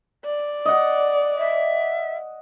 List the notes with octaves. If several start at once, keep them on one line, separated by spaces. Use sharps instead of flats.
D5
D#5 F#5
E5